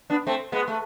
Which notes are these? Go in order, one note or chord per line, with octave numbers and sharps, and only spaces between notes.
B3 D4
A3 C4
G#3 B3
A3